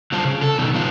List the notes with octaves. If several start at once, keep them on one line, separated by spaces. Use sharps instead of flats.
D3 F#3 G3 F4 C5 A5
C#3
A4
B2 D#3
F#3 B3 F4